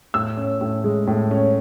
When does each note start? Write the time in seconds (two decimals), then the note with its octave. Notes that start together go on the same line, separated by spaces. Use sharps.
0.14 A2 E6
0.37 C#4
0.61 A2
0.84 G#3
1.07 A2
1.31 C#4